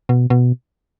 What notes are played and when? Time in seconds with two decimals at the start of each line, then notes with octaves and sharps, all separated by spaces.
0.09 B2
0.30 B2